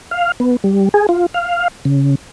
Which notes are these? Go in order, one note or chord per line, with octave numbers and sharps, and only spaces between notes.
F5
B3
G3
G#4
F4
F5
C#3